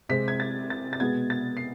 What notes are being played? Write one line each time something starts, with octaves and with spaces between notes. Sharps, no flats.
C3 G#3 C4 B6
G#6
A6
A6
A6
B2 G#3 B3 G#6
A6
C7